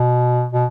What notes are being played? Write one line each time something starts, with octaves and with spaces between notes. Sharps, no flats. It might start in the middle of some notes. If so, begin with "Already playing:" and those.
Already playing: B2
B2